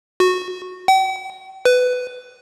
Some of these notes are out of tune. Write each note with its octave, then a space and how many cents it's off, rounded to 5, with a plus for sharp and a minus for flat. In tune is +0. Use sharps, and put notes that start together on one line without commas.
F#4 -15
G5 -45
B4 +15